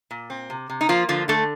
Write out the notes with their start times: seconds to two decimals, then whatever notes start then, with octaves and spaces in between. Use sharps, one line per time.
0.11 A#2
0.30 C4
0.50 C3
0.70 C3
0.81 D#4
0.89 F3 A#3 F4
1.09 D3 F3 F4
1.28 D3 A3 A4